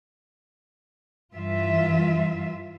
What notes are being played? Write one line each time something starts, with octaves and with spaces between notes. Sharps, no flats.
G2 E3 F4 E5